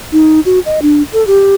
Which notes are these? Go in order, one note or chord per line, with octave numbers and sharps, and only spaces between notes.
D#4
F#4
D#5
D4
A4
G4